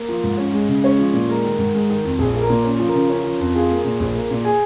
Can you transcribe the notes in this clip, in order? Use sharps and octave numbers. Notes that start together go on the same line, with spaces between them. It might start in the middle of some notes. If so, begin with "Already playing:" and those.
Already playing: A#3
F3
G#2
C#4
G#3
C#3
G#3 C#4 C#5
F3
A#2
G#3 A#4
D#3
G#2
G#3
D#3
F2
A#1 G#4
A#3
A#4
A#2
C#4
F3
A#4
C#3
C#4
F3
F2
F4 G#4
A#3
A#2
A#1
A#3
A#2
G#4 G#5